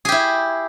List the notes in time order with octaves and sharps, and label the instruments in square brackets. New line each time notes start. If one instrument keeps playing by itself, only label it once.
[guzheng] G#4
G4
E4